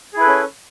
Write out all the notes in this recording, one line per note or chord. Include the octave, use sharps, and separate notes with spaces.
C#4 E4 G#4 A4 B4